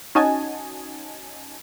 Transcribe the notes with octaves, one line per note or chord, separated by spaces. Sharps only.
C#4 D#4 F#4 D#5 G#5 A5